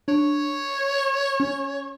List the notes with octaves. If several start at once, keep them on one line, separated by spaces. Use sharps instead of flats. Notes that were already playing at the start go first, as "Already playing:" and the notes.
D4 C#5
C#4